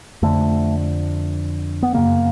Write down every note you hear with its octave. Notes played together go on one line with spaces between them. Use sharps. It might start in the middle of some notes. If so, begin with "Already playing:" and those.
F2 D3 A3
B3
F#2 C#3 A#3